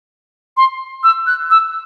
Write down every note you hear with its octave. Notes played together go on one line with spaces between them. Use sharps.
C6
E6
F#6
E6